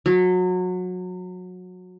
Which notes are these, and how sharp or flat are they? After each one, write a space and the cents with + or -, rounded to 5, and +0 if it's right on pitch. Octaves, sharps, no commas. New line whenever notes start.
F#3 -25